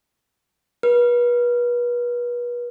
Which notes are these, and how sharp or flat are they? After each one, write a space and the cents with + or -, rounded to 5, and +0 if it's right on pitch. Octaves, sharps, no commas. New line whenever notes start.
B4 -35